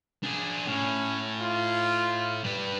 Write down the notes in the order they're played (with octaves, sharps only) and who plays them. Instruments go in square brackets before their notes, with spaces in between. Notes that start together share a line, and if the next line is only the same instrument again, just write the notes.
[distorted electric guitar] D4 G#4
[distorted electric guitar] A2 [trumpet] C#4
[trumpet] F4
[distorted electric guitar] G3 B4